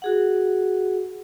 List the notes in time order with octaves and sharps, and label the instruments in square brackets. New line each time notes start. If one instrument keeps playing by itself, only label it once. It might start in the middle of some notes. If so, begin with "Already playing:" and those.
[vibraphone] F#4 G#4 F#5